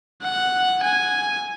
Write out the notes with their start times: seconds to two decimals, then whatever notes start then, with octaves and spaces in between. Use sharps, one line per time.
0.23 F#5
0.83 G#5